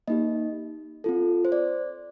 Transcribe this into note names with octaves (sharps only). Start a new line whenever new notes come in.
A#3 D#4 G4 D#5
C4 F4 A4
C5
D5